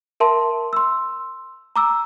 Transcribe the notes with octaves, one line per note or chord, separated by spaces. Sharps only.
A#4 E5 A5 C6
C6 E6
A#5 D6 E6